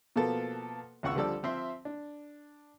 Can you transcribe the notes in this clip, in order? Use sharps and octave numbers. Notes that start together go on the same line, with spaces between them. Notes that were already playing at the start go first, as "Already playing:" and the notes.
B2 F3 A#3 B3 A4
G#1 C#2 F#5 C#6 E6
D3 F3 G3 A4 D5 E6
F3 C4 E5 C6
D4